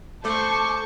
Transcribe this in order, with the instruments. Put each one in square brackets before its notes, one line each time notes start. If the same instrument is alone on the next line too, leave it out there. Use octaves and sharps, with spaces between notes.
[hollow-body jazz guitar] A3 [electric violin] C5 C#6 [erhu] A5 [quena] D6